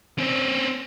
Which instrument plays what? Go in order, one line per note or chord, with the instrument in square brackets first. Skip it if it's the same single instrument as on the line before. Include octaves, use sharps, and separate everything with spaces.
[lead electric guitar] C4 C#4